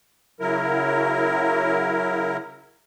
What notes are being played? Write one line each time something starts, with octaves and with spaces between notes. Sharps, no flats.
C#3 F#3 E4 A#4